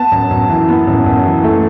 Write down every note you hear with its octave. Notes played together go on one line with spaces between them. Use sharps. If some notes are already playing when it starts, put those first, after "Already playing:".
Already playing: B3 A5
F#2
F#2
E3
B3
F#2
F#2
E3
A3